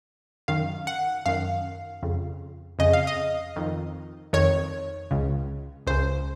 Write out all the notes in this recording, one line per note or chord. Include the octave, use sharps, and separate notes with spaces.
F#2 D#3 F5
F#5
F#2 D#3 F5
F2 C#3
F2 C#3 D#5
F5
D#5
F2 D#3
F2 D#3 C#5
C#2 C#3
C#2 C#3 C5